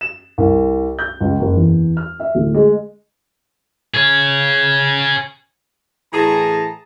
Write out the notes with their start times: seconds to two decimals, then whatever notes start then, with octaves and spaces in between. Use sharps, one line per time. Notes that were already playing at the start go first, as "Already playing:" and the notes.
0.01 E7
0.38 C2
0.99 G6
1.21 C#2
1.40 F#1
1.56 E2
1.97 F6
2.20 E5
2.35 D1
2.55 G#3
3.94 G#4 C#5
6.13 A2 E3 G#4 A5 A#5